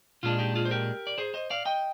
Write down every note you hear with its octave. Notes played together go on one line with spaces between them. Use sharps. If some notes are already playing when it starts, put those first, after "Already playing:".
A#2 G#3 D4 F4
D#4 G4
F4 G#4
C5
G4 A#4
D5
G#4 C5
C5 D#5
D5 F5
D#5 G5